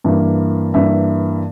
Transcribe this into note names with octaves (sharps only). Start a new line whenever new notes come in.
G2 E3 A#3
G2 E3 A#3 E5